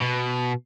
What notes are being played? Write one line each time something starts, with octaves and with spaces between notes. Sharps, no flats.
B2